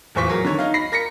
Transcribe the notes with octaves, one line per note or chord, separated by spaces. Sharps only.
D1 E2 A#2 C5 C#6 B6
F#3 G#4 A#4
D3 D#3 C#5
D#4 F5
B5 A#6 C7
A#4 A#6 B6 C#7